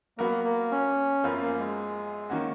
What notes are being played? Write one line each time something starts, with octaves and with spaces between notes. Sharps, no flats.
F#3 A#3 B3 F#4 A#4
A#3
C#4
F#2 F3 B3 F4 A#4
A#3
G#3
D#3 A#3 C#4 F#4